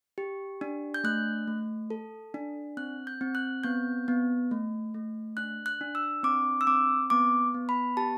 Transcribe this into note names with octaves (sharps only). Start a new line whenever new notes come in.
G4
D4
G6
A3 F#6
A3
A4
D4
C4 F#6
G6
C4
F#6
B3 G6
B3
A3
A3
D4 F#6
F#6
D4
E6
C4 D6
E6
C4 D6
B3 D6
B3
B5
G4 A5